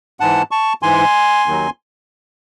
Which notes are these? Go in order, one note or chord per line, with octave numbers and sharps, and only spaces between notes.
G#2 E3 F#5 A5
A5 C#6
G#2 E3 G#5 C6
D#2 D#3 F#3